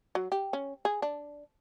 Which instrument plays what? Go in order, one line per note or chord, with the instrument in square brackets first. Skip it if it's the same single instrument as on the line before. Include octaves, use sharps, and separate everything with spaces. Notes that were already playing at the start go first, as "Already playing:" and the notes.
[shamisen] F#3
G4
C#4
G#4
D4